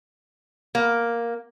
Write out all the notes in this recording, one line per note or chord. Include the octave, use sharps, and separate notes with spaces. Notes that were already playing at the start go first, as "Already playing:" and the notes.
A#3